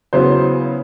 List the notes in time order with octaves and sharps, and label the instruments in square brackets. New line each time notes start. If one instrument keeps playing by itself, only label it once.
[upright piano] C#3 F#3 B3 E4 C5